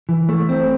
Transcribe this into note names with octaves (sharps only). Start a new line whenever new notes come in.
E3
A3
C4